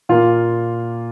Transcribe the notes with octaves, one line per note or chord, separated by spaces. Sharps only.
A#2 A#3 F4